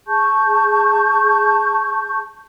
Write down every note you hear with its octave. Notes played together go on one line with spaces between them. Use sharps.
G#4 A5 C#6 G6